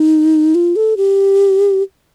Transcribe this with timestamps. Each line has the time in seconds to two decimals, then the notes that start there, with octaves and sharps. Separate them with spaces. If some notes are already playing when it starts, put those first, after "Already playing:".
Already playing: D#4
0.55 F4
0.76 A4
0.97 G4